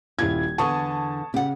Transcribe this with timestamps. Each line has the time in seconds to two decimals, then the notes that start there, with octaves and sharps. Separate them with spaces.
0.19 D#1 E4 F4 G#6
0.58 E2 D3 A5 C#6 D#6
1.34 C#3 G4 F#5